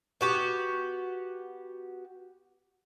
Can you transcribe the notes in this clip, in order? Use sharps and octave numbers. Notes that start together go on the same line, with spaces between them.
B3 F#4 G4